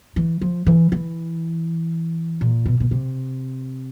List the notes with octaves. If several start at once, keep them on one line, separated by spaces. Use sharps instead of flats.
E3
F3
E3
E3
A#2
B2
B2
C3